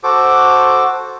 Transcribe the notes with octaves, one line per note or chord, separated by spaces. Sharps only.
F#4 A4 C5 D6